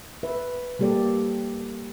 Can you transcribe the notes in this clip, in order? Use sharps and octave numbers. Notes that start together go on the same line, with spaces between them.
B4 E5
G3 A#3 G4 A4 D5